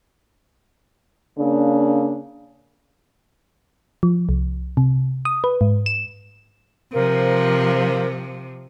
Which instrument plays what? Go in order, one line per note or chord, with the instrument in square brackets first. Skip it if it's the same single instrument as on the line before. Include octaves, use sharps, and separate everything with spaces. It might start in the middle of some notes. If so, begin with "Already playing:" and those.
[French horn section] C#3 A#3 D4
[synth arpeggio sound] F3
C2
C3
D#6
B4
G#2
E7
[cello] C3 F3 [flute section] A#4 C5 F5